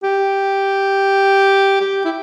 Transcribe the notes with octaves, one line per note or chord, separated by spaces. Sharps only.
G4
G4
E4